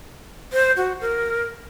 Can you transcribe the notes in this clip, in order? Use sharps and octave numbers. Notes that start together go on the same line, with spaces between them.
C5
F#4
A#4